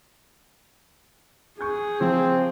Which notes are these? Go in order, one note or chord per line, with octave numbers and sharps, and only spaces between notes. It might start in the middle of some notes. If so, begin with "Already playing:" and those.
G#4 C#6 G6
F3 C4